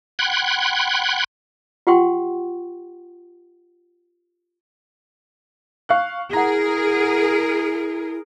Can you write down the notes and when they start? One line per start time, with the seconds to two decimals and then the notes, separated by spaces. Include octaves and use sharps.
0.19 F#5 G5 B5 C6 F#6 G#6
1.87 F4 G4 F#5 G5 C6 C#6
5.89 F5 C#6 F#6
6.33 E4 G#4 A#4 F#5 A#5